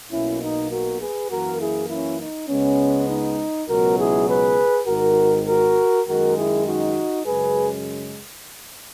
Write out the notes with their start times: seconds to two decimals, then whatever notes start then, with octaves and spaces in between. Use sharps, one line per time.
0.11 B1 B2 A#3 C#4 E4
0.41 D#4
0.70 F#4 A#4
1.00 G#4 B4
1.31 F#2 E3 A#3 F#4 A#4
1.60 E4 G#4
1.89 C#4 E4
2.20 D#4
2.49 C#2 C#3 G#3 B3 C#4
3.08 D#4
3.68 C#2 B2 F#3 B3 F#4 A#4
3.98 E4 G#4
4.27 G#4 B4
4.87 G#1 G#2 D#3 F#4 A#4
5.47 F#4 A#4
6.07 F#2 D#3 G#3 F#4 A#4
6.36 E4 G#4
6.66 D#4 F#4
7.26 F#2 C#3 G#3 G#4 B4